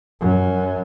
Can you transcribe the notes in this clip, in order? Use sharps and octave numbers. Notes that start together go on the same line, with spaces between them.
F#2